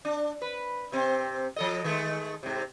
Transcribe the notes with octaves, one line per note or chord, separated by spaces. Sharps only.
D4
B4
C3 C4
F3 A4 D#5
D#3 G#3 A3
G#2 C3